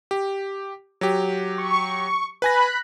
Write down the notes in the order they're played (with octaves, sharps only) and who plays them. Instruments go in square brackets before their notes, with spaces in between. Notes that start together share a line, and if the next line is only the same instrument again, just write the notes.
[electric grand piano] G4
F#3 G4
[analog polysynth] C#6
[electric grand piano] B4 G#5 A#6 [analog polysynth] B5 F#6